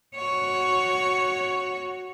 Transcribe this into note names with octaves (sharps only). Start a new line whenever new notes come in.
F#4 C#5